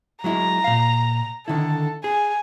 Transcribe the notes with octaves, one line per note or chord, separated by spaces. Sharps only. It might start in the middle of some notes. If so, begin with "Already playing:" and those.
F#3 G#3 E4 A#5
A#2 F5
D3 D#3 E4 A4
G#4 G#5